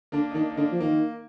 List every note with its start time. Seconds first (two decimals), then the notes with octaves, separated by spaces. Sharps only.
0.12 D3 A#3 D4
0.31 D#4
0.35 D#3 A#3 D4
0.50 D#4
0.57 D3 A#3 D4
0.72 F3
0.80 D#3 A#3